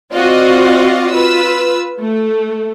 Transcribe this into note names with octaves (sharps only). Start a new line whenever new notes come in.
C4 F4 F#4 D5 D#5 F5
F4 B4 E6
A3